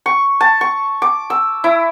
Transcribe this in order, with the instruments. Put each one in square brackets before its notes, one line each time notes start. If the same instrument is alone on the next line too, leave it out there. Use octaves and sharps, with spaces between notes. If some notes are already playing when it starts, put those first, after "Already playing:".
[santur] C#6
A5
C#6
D6
E6
E4